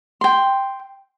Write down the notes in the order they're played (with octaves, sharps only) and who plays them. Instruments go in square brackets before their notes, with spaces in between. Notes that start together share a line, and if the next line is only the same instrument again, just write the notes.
[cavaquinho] G5 C6